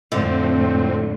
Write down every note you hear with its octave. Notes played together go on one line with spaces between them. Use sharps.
F2 A2 D3 C4